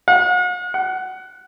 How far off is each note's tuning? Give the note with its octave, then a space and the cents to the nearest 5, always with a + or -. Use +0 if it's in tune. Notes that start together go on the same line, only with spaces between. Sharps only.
F#5 -45
F#5 +15